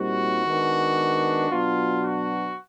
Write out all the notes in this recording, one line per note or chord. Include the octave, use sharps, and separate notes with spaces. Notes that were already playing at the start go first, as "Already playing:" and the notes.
Already playing: A#2 G3 C4 D#4 F#4
D#3 G#3 B3 D4
B2 F#3 B3 D4 F4
F#4